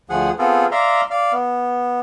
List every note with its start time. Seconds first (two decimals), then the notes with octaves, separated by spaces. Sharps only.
0.10 D2 F3 G#4 F#5
0.39 B3 C4 F4 G#4 A4
0.72 D5 E5 F5 A#5 C6
1.11 D5 F5
1.32 B3